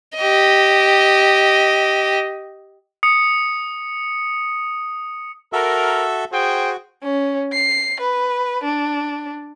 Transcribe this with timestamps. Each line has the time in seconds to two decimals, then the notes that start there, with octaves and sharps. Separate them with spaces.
0.17 G4 D#5
3.03 D#6 C#7
5.53 F#4 A4 A#4 E5
6.32 F#4 G#4 C5 G5
7.03 C#4
7.53 C7
8.00 B4
8.64 D4